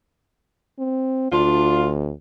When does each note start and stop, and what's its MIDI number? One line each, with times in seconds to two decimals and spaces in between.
0.79 1.31 60
1.32 2.11 38
1.32 1.89 62
1.32 1.89 65